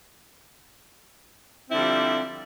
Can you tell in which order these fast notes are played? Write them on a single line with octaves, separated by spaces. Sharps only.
C4 E4 D3 G3 F3